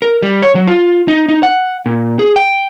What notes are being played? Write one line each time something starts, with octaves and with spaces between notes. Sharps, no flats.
A#4
G3
C#5
F#3
F4
D#4
D#4
F#5
A#2
G#4
G5